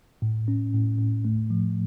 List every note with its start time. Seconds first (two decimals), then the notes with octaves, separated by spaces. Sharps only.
0.22 A2
0.48 C#4
0.73 A2
0.99 A2
1.25 A3
1.50 F3